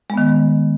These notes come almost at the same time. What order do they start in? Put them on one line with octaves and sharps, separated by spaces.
G#3 B3 D#3